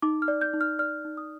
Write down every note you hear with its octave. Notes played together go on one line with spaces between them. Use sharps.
D#4 D6
F6
D5
G6
D#4
F6
D5 F6
D#4
D#6